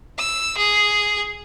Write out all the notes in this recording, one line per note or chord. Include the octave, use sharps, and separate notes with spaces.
E6
G#4